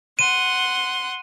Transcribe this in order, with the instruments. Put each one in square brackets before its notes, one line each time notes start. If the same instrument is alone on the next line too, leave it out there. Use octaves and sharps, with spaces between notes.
[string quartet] F#5 C6 [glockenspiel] D#7